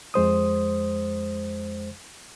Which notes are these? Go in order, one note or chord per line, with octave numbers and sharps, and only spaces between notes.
F2 G#3 C5 D#6